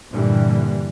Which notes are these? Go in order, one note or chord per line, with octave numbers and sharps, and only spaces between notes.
G2 A#2 D3 E3 G3